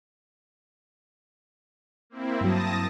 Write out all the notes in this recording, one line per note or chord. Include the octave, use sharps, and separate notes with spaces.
A#3 C4 E4
G2 F#3 A5 D#6 A#6